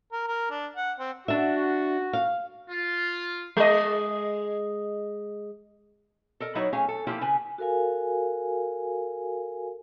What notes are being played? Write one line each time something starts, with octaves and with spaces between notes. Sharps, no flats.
A#4
A#4
D4
F#5
C4
D4 F#4 E5
F5
F4
G#3 D#5
A4 A#4 D#5
F#3 D#4 E4 B4 C#5 D#5
A3 C#4 G#4 F5
A4
F3 A#3 E4 F4 G4
C#3 B4 G#5
F#4 A4 A#4 F5 G#5